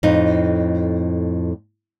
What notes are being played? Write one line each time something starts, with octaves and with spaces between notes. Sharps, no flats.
F2 A2 D#4